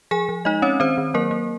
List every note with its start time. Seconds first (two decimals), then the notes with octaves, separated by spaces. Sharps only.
0.11 F3 G#4 G#5
0.29 F3
0.45 G#3 D#4 D#5
0.62 C4 C#4 C#5
0.80 D#3 C4 C5
0.98 D#3
1.14 F#3 A#3 A#4
1.31 A#3